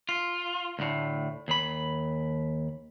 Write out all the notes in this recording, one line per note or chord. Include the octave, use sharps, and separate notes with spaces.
F4
D2 A2
D#2 B5